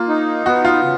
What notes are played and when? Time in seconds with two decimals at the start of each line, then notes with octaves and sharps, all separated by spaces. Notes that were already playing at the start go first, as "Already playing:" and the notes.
Already playing: A#3 F4
0.09 D#4
0.46 B3 F#4
0.65 F4
0.83 C#3